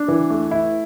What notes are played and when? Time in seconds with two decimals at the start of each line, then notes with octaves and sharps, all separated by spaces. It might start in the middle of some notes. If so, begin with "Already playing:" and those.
Already playing: D4
0.08 E3
0.30 A3
0.51 E4